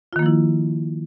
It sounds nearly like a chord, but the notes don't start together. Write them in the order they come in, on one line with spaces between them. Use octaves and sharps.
F4 D#3 A#3 F3 E4